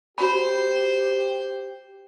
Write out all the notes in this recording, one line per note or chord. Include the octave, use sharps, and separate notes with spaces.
F#4 G4 C5 B5